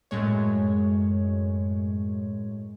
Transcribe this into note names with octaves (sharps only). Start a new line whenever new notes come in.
F#2 A2 G#3 C#5